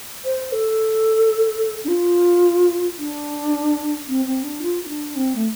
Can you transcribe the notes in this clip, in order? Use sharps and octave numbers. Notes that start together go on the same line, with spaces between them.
C5
A4
D4
F4
D4
C4
C4
D4
F4
F4
D4
C4
A3